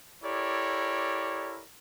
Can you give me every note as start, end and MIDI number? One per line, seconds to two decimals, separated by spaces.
0.23 1.64 64
0.23 1.64 67
0.23 1.64 69
0.23 1.64 70
0.23 1.64 73
0.23 1.64 74